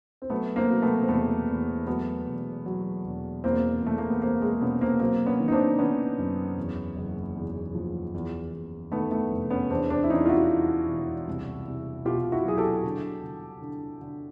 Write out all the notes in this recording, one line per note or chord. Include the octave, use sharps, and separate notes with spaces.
C4
F#3 A3 B3
A#3 C4
F#3
A3 B3
C4
E2 A3 B3
E2
F#3 A3 B3
E1
F#3
E1
E2 A#3 C4
E2 A3
A#3
B3
E2 A#3 C4
G#3
B2 B3 C#4
A#3 C4
F#3 A#3 C4
B3 C#4
D#3
D#4
C4 D4
D#3 B3 C#4
F#2
E2
F#1
E2
F3
E2
E2
D#3 A3 B3
A3 B3
F1
B3 C#4
E2 C4 D4
C4 D4
E4
E2 C#4 D#4
F4
E4 F#4
E2
E1
C2
C2
B2 F4 G4
E4 F#4
F#3 G#4
G4 A4
D3
D3
D3
D3